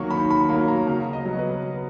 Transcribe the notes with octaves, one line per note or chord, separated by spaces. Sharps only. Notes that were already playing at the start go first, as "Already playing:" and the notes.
Already playing: D#3 F#3 A#3 C#6
D#3 B5
B5
F#3 A#3 B5
A#5
C#3 A#5
D#5
F#3 B3
B4